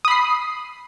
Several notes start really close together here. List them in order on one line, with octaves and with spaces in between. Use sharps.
D#6 B5 C7